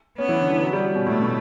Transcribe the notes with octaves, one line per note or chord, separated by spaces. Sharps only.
B3 C#4
E3
D3
E3
F#3
G3
B2
A2 A3
B2